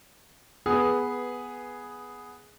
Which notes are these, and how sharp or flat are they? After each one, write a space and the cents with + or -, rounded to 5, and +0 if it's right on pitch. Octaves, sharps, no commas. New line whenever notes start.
B3 +0 G#4 +0 B4 -10